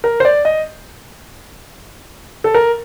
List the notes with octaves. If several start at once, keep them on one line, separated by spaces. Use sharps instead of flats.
A#4
C5
D5
D#5
A4
A#4